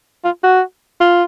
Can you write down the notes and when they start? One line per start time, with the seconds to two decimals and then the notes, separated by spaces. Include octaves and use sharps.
0.25 F4
0.44 F#4
1.01 F4